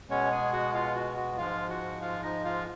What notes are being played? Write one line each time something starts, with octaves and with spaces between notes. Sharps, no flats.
B2 G#3 B3 C#4 C#5
G#4 G#5
F#4 F#5
F4 F5
F#4
F#4
G#2 F3 G#3 F4 F5
F#4 F#5
F4 F5
D#4 D#5
F4 F5